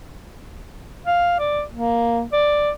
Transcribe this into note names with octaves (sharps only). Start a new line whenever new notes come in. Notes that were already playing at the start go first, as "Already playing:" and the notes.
F5
D5
A#3
D5